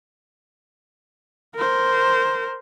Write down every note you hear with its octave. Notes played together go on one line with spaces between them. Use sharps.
A#4 C5